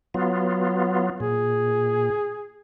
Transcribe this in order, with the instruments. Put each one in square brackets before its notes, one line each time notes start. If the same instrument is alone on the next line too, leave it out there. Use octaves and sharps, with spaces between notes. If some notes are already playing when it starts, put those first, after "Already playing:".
[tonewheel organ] F#3 B3 F4
[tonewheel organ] A#2 [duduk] G#4